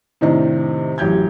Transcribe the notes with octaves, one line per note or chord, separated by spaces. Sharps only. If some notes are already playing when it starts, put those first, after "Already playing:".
A2 C3 D#3 C4 D4 D#4
A1 F#2 G4 G6 G#6